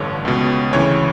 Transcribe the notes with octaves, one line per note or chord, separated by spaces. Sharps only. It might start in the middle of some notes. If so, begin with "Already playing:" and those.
Already playing: A1 G2 D3 C#5
C#2 B2
D2 C#3 E3 C#5